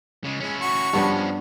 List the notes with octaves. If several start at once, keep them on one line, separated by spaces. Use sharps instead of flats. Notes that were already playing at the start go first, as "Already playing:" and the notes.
C#3 G#3
G#3 C#4 E4
F#4 C#6
G2 F3 B3 C#4 D4